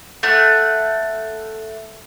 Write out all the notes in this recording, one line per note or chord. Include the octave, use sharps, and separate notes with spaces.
A3 F#5